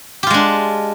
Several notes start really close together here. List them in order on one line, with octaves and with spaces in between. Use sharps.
G4 F4 G#3 D4